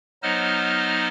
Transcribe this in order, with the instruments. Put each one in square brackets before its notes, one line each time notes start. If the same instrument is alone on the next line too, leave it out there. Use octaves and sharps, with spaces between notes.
[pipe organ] F#3 B3 D#4 C5 D#5 F6